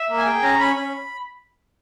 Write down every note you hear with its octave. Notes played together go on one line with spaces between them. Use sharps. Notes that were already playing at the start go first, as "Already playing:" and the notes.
Already playing: E5
A#3
G#5
G#4 G5
C#4 A#5
C#4 B5
C#4